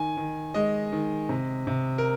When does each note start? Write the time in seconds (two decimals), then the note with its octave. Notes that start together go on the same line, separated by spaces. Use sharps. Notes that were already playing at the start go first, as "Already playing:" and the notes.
Already playing: D#3 G#5
0.17 D#3
0.54 G#3 D#5
0.92 D#3
1.29 C3
1.67 C3
1.98 A#4